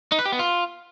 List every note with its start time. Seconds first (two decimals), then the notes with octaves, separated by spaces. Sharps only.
0.12 D#4
0.19 B4
0.25 G4
0.32 B3
0.39 F4